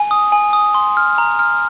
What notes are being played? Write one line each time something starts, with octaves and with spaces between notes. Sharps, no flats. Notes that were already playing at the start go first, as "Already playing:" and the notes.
Already playing: G#5
D#6
G#5
D#6
C6
F6
A#5
F6